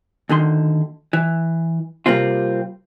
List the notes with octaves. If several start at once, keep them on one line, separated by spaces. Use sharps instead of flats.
D2 D3 D#3 C6
E3
C3 G3 A#3 C4 F4